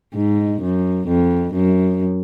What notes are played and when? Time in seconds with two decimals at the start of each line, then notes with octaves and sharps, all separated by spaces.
0.15 G#2
0.62 F#2
1.08 F2
1.55 F#2